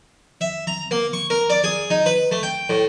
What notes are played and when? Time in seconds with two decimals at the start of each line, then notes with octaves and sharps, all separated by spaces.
0.41 E5
0.67 A#5
0.91 A#3
1.13 C#6
1.30 A#4
1.50 D5
1.64 G#4
1.90 D#4
2.06 B4
2.31 A3
2.43 G5
2.69 A2